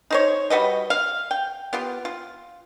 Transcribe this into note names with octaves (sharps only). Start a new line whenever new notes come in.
D#4 C5 C#5
G3 F#4 B4 D#5
F5
G5
B3 F4 G4
F4